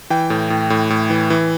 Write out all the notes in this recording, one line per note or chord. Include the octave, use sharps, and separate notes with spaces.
E3 G5
A2
A2
A2
A2
E3
E3